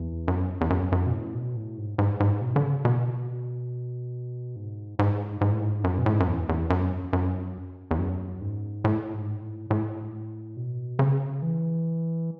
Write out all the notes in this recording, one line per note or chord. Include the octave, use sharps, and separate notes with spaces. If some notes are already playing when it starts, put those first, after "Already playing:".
Already playing: E2
F#2
E2
F#2
F#2
B2
A2
B2
A2
G#2
G#2
G#2
B2
D3
C#3
B2
G#2
G#2
G#2
A2
G#2
F#2
B2
A2
G#2
F#2
E2
E2
F#2
F#2
E2
F#2
G#2
A2
G#2
A2
A2
B2
C#3
E3